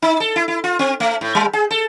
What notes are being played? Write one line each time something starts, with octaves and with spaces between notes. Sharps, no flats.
D#4
A4
E4
E4
F4
C4
A3
A2
G3
G#4
A4